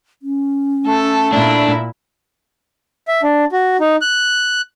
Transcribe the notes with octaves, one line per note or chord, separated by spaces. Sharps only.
C#4
A3 A4
A#2 D4 E4
E5
D4
F#4
D#4
F#6